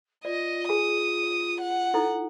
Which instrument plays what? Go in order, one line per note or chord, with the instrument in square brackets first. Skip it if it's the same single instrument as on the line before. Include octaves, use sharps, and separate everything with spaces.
[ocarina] F4 [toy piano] D5 [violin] D#5
[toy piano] G#4 G#5 [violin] D#6
[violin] F#5
[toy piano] D#4 E4 A4